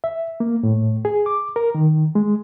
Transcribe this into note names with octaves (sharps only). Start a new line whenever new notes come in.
E5
A#3
A2
G#4
D6
A#4
D#3
G#3